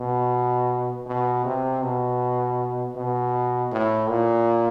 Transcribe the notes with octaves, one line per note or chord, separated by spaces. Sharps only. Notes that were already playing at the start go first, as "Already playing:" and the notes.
Already playing: B2
B2
C3
B2
B2
A2
A#2